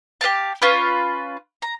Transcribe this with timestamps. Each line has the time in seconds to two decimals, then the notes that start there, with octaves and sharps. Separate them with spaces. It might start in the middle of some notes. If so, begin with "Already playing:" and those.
0.21 G4 B4 F5 A5
0.62 C#4 F4 B4
1.62 A#5